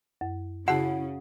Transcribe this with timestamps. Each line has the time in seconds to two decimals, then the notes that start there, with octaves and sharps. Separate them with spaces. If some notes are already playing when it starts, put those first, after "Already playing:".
0.21 F#2
0.68 C#3 E4 F#4 G#4 F#5 A5